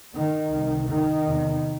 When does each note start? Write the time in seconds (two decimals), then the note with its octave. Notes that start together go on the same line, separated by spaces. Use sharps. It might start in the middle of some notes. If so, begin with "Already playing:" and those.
0.15 D#3
0.51 C2
0.56 C3
0.89 D#3
1.24 E2 C3